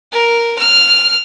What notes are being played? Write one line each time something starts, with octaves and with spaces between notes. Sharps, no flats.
A#4
F6